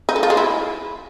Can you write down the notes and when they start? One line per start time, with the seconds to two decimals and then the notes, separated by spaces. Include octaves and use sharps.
0.09 D#4
0.16 A4
0.23 F4
0.30 G#3
0.37 E4